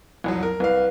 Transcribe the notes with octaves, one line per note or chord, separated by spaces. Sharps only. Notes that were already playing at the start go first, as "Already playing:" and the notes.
C2 F2 F#3
A#4
C2 B4 F5